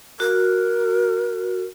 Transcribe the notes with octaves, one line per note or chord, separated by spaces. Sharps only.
F#4 A#4